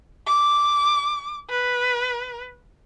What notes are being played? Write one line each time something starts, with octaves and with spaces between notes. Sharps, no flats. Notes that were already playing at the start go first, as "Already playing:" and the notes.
D6
B4